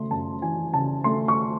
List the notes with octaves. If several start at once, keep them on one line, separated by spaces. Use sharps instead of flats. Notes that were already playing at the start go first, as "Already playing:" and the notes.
Already playing: C#3 A3 C6
F#2 A5
E3 G#5
C#3 A5
A3 C6
C#6